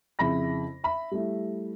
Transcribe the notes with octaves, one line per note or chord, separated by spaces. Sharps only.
F2 C#3 E4 B5 A#6
E5 B5
G3 A3 E4